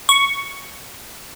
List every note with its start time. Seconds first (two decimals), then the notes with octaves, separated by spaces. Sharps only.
0.09 C#6